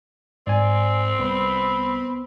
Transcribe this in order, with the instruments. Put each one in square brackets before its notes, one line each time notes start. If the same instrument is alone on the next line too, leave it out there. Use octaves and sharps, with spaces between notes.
[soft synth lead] G#2 [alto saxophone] C4 [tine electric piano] D5 G#5
[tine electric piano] C2 [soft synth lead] B3 [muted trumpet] B5